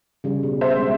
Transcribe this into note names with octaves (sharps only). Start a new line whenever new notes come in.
C#3 G3
B2
C5 E5
G#3 C4